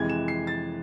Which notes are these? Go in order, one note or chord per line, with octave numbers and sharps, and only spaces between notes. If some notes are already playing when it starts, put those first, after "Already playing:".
Already playing: F2 C3 E3 G#3 G#6
E7
C7
A6